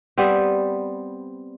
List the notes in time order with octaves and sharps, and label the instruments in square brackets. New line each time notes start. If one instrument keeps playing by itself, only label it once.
[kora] G3 B3 C4